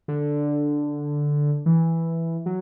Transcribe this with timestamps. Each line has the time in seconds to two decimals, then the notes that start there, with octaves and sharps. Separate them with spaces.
0.08 D3
1.66 E3
2.46 F#3